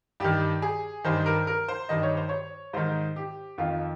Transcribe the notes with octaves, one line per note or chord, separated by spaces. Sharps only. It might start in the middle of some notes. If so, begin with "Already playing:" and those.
G2 D#3 G4
G#4
G2 D#3 C5
A#4
A#4
C5
G2 D#3 D#5
C#5
C5
C#5
G#2 D#3 C5
G4
F2 D#3 F4